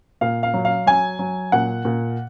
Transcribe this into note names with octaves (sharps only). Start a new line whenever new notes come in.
A#2 F5
F5
F#3
F5
F#3 G#5
F#3
A#2 F#5
A#2